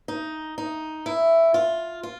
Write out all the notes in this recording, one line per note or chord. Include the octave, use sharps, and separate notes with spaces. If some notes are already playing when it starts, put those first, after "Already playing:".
D#4
D#4
E4
F4
F4